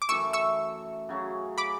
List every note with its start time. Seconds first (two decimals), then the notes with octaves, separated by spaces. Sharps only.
0.02 D6
0.08 F#2 E3 A3 C#6 E6
0.33 C#6 E6
1.09 C#3 F#3 C#4
1.58 B5 D6